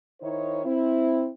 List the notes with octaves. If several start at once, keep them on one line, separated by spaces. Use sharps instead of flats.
D#3 D#4 E4 C5 C#5
C4 E4